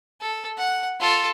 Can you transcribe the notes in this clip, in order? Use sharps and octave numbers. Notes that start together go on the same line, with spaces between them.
A4
F#5
F4 A4